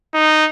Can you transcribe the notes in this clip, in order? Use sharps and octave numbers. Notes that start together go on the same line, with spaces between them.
D#4